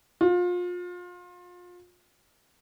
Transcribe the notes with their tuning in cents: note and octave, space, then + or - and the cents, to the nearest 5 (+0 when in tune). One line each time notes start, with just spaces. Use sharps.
F4 +30